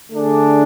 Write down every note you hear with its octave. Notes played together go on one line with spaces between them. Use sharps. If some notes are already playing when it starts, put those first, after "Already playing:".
D3 A3 D4 G#4